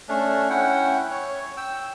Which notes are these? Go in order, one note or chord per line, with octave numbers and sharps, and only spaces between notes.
A3 C#4 D4
C#4 E4 F#5 G5
C#5
G5 E6